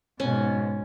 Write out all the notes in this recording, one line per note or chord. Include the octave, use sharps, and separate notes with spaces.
G#2 B2 C#4